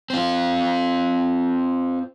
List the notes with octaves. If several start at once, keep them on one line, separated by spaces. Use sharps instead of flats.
C4 F4